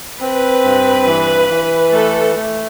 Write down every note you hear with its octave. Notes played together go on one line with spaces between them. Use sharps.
C4 B4
G2
E3
E3
A3 A4
A3